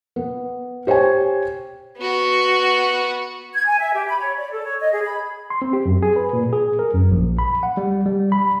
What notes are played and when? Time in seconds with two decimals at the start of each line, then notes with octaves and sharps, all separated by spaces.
0.16 B3
0.87 G4 C5 C#5 G5 G#5
1.98 B3 F#4
3.53 G#6
3.66 G#5
3.79 E5
3.93 G4
4.08 B5
4.19 C#5
4.37 D5
4.51 A4
4.64 C#5
4.79 D#5
4.92 G#4
5.04 B5
5.50 C6
5.62 C4
5.73 G4
5.86 F#2
6.03 G#4
6.16 B4
6.33 A#2
6.53 G#4
6.79 A#4
6.94 F#2
7.11 A#1
7.39 B5
7.63 F#5
7.77 G3
8.06 G3
8.32 B5